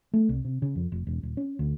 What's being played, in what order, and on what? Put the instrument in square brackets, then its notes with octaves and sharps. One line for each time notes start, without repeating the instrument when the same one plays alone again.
[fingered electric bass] A3
C2
C3
C#3
F2
F1
E1
D#1
C#4
D2